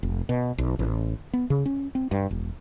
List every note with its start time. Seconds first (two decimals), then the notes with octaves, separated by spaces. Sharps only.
0.03 F1
0.29 B2
0.58 B1
0.79 A1
1.33 B3
1.50 C#3
1.66 C#4
1.95 C4
2.11 G2
2.31 E1